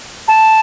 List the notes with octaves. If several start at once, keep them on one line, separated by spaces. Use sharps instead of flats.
A5